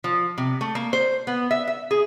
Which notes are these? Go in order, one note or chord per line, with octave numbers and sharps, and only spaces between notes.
F3
C3
A3
A#3
C5
B3
E5
E5
G#4